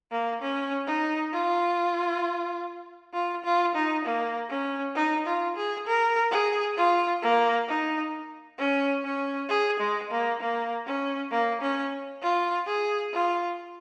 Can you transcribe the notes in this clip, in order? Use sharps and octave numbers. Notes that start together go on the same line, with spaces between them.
A#3
C#4
D#4
F4
F4
F4
D#4
A#3
C#4
D#4
F4
G#4
A#4
G#4
F4
A#3
D#4
C#4
C#4
G#4
G#3
A#3
A#3
C#4
A#3
C#4
F4
G#4
F4